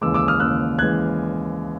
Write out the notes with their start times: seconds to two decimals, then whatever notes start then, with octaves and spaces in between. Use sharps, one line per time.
0.01 D#2 C#3 E3 G#3 D6 E6
0.14 D6 E6
0.28 D#6 F6
0.40 D#2 C#3 E3 G#3 E6 F#6
0.79 C#3 E3 G#3 F#6 G#6